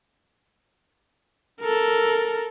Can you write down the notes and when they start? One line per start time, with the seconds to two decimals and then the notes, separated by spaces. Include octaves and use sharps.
1.61 A4 A#4